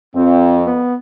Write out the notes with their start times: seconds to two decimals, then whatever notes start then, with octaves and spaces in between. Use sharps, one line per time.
0.15 F2 C4
0.66 B3